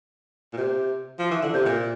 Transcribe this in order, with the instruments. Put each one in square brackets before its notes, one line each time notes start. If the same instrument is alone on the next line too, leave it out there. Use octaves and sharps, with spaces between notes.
[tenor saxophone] A#2
C3
F3
E3
D3
C3
A#2